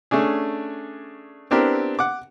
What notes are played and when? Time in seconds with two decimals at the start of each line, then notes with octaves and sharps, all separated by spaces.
0.11 A3 C#4 D4 G#4
1.51 B3 C4 D4 E4 G4 A#4
1.99 F#5 D6